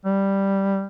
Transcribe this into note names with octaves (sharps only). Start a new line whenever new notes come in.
G3